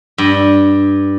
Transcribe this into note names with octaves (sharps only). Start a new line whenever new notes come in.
G2